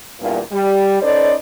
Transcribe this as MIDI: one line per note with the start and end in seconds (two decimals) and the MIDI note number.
0.20 0.39 40
0.20 0.39 43
0.20 0.39 46
0.51 0.97 55
1.02 1.33 61
1.02 1.33 63
1.02 1.33 69
1.02 1.33 71
1.02 1.33 72
1.02 1.33 74